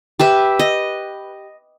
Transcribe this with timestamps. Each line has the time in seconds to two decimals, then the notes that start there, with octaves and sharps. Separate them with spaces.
0.19 G4 B4 E5
0.59 D#5